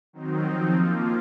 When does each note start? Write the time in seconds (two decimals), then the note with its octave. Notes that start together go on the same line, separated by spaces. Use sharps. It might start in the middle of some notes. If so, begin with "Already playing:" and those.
0.13 D#3 F#3 C4 D#4
0.45 F3 C4 D#4
0.75 F3 A#3 F4